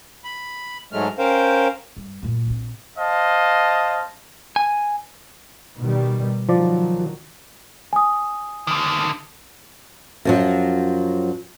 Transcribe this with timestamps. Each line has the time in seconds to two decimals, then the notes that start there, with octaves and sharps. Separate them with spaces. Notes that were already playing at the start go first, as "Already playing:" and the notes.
0.25 B5
0.92 G#2 F#3 G#3 A3 F6
1.19 C#4 A#4 C5 F5 G5
1.97 G2
2.23 F#2 A#2
2.47 A#1 C4
2.98 C5 D#5 F5 A5
4.56 G#5
5.78 B2 D#3 G3
6.49 D#3 F3 F#3 D5
7.93 G#5 D#6
8.67 D3 D#3
10.25 F#2 F3 F#3